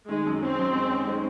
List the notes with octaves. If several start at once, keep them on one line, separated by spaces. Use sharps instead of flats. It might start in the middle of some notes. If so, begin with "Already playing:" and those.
D#3 G#3
F#2
C4 C#4
F#2
G#3
C#4
G#3